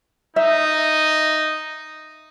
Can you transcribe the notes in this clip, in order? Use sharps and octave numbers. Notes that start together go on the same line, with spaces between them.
D#4 E5